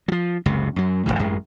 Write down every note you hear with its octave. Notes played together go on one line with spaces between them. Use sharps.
F3 F#3
F#1 C#2 C3
F#2 F#3
D1 F#2 A2 E3
A1 F#2 G#3